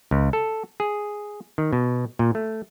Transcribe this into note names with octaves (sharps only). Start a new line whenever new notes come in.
C#2
A4
G#4
D#3
B2
A#2
A3